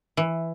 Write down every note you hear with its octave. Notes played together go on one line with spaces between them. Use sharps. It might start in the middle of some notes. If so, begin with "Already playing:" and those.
E3